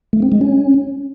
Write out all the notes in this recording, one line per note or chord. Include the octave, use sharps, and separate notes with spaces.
A3
C4
G#3
C#4